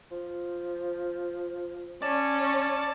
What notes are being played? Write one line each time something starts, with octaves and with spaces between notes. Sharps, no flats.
F3
C#4 D5 A5